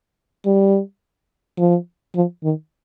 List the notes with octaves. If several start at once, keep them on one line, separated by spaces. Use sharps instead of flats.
G3
F3
F3
D#3